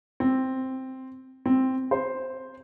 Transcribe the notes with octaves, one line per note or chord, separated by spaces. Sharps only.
C4
C4
C5